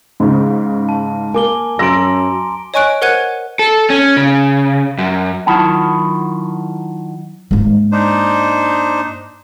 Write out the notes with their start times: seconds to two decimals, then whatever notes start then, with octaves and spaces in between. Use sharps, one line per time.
0.20 G#2 C#3
0.89 A5
1.34 A#3 G#5 D6 G7
1.79 F#2 A#5 C6 E6 A#6 D7
2.74 C#5 D#5 G#5 C#6 F#6 D7
3.02 A#4 C5 F#5 F#6 G#6 D#7
3.59 A4
3.90 C#4
4.17 C#3
4.98 F#2
5.46 D#3 F#3 E4 F4 F#5 A5
7.51 G#2 A#3
7.92 D4 D#4 C5